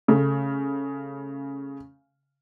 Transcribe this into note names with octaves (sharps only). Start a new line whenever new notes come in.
C#3 A3